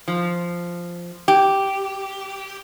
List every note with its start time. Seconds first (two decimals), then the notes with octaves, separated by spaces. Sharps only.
0.08 F3
1.28 G4